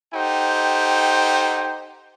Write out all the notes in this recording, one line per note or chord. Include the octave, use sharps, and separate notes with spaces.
D#4 G4 A4 C5 F#5 G5